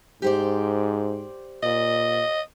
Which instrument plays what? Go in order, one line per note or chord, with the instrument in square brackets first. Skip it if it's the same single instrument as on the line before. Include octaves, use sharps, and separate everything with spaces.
[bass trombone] G#2 [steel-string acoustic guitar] G4 C5 D5
[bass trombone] A#2 [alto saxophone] D#5